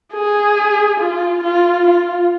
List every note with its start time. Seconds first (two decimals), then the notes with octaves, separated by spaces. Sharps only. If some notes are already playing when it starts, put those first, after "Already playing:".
0.14 G#4
0.99 F4
1.44 F4
1.87 F4